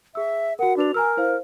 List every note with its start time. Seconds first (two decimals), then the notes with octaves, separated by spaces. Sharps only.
0.15 G#4 E5 E6
0.59 F#4 A#4 F#5
0.77 D4 F#4 B4 F7
0.94 A#4 G#5 A#5 E6
1.17 E4 C5 F5